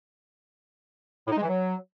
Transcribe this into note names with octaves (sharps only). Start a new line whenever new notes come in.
A2
D#4
G#3
E3
F#3